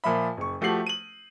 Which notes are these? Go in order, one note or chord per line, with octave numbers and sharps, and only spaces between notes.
A#2 F3 E5 B5
F#1 C#6
F3 A3 F#4 G4 C7 F#7
D#7 F#7